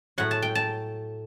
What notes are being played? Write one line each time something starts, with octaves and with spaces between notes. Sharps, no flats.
A2 F#3 F#5
A5
G5
A5